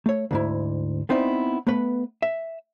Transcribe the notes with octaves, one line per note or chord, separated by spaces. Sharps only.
A3 C#5
D2 G#2 E4
B3 C4 D#4 E4 D5
A3 B3 B4
E5